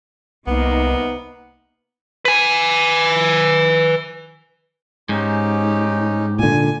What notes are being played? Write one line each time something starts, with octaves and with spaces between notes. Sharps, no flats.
C2 C3 A#3 B3 D#4
B4 G#5
G#2 C#4 D#4 G4
A#2 D3 G#5